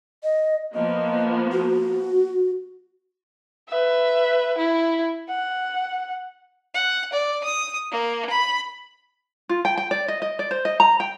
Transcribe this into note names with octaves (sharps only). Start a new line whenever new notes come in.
D#5
F3 A#3 B3 D#5
F#4
B4 E5
E4
F#5
F#5
D5
D#6
A#3
B5
F4
G5
G5
D5
D#5
D#5
D5
C5
D#5
A#5
G5